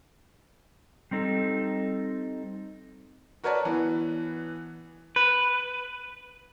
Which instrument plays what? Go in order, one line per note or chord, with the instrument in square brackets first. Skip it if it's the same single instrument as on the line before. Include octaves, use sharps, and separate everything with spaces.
[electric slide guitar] G3 C4 D#4 A4
[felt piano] F#4 A#4 B4 C#5 D5 A5
E3 B3
[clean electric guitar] B4